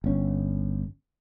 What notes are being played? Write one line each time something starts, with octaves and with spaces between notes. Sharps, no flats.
G1 C#4